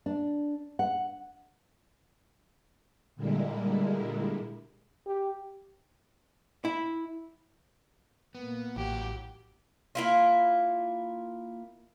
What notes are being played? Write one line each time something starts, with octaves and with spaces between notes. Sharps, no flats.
D4
F#5
A#2 D3 G3 G#3 A#3 E4
G4
E4
A#2 A#3 B3
A1 E3 F#3 F#4 G4
A#3 E4 F4